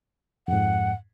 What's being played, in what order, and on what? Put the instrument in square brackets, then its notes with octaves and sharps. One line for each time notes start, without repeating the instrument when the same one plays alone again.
[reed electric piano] F2 G#2 [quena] F#5